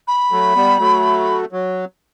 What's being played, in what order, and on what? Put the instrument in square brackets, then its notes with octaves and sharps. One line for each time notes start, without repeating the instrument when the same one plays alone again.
[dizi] B5
[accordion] F#3 A3
G3 B3
F#3 A3
F#3